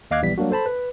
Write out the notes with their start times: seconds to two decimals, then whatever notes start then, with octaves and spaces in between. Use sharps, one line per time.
0.11 D#2 D#5 F5 D6 F#6 G#6
0.22 A#1 E3 G3 B3 B6
0.38 F#3 G3 A#3 D4 F#4
0.51 A4 C5 A5 B5
0.66 B4